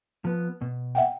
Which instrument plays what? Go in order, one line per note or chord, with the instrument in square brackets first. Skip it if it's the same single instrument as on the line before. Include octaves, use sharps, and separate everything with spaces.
[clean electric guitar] F3 B3
B2
[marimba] E5 F#5 G5